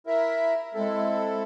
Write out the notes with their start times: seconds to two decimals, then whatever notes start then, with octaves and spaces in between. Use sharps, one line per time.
0.07 E4 A#4 E5
0.75 G#3 C4 E4 A4